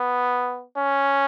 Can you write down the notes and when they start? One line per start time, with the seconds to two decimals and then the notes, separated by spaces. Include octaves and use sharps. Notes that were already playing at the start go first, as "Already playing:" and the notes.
Already playing: B3
0.78 C#4